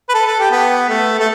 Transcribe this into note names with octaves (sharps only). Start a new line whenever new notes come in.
B4
A4
A4
G4
B3
A3
A3